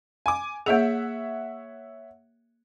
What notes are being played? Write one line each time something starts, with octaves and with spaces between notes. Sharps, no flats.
G#5 D6
A#3 G#4 C#5 E5 F#5